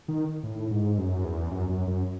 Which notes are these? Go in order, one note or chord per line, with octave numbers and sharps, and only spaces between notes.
D#3
A2
G#2
F#2
E2
F#2
F#2
F#2